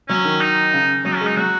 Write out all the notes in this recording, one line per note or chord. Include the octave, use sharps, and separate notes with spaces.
F#3 C#4
D#3
D#4
C#3
F#3 D#4
C#4
G#3
D#4
F#3 F#4